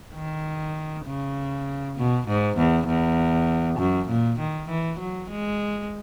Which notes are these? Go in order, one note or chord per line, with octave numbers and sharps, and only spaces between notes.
D#3
C#3
B2
G#2
E2
E2
F#2
A#2
D#3
E3
F#3
G#3